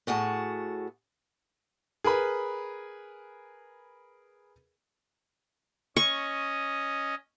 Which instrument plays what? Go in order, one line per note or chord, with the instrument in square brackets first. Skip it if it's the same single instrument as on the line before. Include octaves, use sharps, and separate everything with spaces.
[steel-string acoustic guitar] A2 F#4 G#4 A5
[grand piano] G#4 A#4 B4 B5
[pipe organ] C#4 D#5 [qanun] C#6